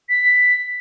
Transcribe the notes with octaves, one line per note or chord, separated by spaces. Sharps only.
B6